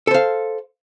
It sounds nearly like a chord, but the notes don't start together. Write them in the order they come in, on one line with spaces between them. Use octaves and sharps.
A4 C5 F5